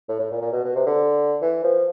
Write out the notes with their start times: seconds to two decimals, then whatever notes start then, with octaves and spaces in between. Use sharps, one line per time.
0.09 A2
0.19 A2
0.31 A#2
0.41 A#2
0.53 B2
0.65 B2
0.75 C3
0.86 D3
1.42 E3
1.64 F3